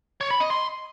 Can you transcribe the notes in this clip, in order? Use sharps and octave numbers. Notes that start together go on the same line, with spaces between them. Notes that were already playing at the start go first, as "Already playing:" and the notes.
C#5
B5
D#5
C6